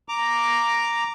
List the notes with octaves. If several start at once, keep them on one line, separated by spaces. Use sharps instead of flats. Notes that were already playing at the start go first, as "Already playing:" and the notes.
A#5 D6